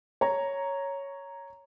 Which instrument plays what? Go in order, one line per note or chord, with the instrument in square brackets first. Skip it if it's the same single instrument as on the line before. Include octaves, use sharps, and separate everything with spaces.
[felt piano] C#5 A#5